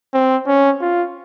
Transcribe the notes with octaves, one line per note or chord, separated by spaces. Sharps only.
C4
C#4
F4